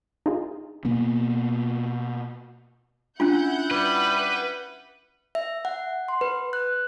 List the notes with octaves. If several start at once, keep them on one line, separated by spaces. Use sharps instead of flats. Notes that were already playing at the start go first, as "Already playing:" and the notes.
D#4 F4 G#4
B2 A#3 B3
C#4 D4 E4 F4 F#5 G6
G3 B4
E5
F#5
C6
B4
F#6